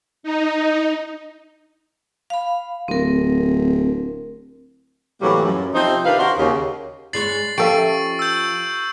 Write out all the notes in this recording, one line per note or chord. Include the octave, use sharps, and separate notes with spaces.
D#4
F5 B5
D1 C4 A#4
A2 C3 E3 F#3 G3 A#3
F#2
C3 F3 C4 D#4 C5
C3 D#3 D4 B4 F5
F#4 A#4 C5
D#2 C#3
G2 G#3 C#5 A6 C7 F#7
F3 C#4 G4 A4 E5 F5 C#6 D7
E6 G6